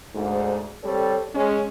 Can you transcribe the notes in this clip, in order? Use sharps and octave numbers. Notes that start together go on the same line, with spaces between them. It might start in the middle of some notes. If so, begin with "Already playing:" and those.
D2 G#2
G3 C4 A4 C#5
G#3 C#4